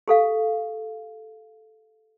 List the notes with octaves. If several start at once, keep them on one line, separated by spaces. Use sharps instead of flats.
G4 A4 F5